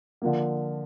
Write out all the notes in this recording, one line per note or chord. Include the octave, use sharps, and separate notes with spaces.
D3 F3 A#3